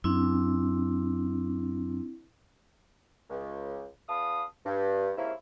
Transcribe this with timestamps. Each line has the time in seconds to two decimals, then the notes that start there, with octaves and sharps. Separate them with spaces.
0.04 F#2 C4 D4 E4
3.29 C#2
4.08 E2 F5 A5 B5 D#6
4.65 G2
5.17 G#2 C3 F3 A#3 C#4 E4